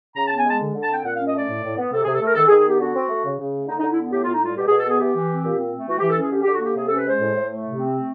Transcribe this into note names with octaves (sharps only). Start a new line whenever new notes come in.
C#3 A#5
A5
B3
G#5
G#3 A5
D3
D3
A5
C4 G5
A#2 F#5
F5
C#4
D#5
A3 D5
A2
A2
B3
C3 A4
G#4
C3
A4
A3 A#4
D#3 A4
G#4
D#3
G#4
B3 G4
D3 F#4
C4
A3
C#3
C#3
A3
D3 D#4
D#4
D3
E4
B3
A2 G4
F4
A2
D#4
G3 F4
B2 G4
G#4
B2
A4
B3 G#4
E3 G4
E3
C4
A#2
C4
A3
E3 F#4
G4
E3
A4
C#4 G#4
D3 G4
G4
D3
F#4
A#3 G4
C3 G#4
A4
C#4
B4
G#3 C5
A2
A2
A3
C3
C4
A3